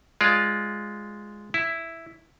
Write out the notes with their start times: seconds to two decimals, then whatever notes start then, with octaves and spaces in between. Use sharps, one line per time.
0.21 G#3 F4 D5
1.54 E4